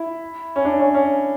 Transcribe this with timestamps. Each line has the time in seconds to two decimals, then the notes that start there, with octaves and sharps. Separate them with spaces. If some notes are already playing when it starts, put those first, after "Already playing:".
Already playing: E4
0.56 C#4
0.65 D4
0.80 C#4
0.94 C#4